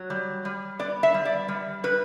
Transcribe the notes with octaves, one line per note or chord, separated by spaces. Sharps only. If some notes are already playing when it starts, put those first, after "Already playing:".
Already playing: F#3
G3
G3
B3 D5
E5
G3
D5
G3
G3 B4